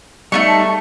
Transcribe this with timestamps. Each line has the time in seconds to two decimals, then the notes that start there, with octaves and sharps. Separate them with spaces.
0.32 G3 A3 B3 D#4 C#6
0.48 A5